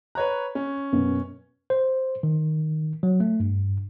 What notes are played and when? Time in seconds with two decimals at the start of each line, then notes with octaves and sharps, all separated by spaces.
0.15 B4 C#5 A#5 F#6
0.55 C#4
0.92 F#2 B2 B3
1.70 C5
2.23 D#3
3.03 F#3
3.20 A3
3.40 G2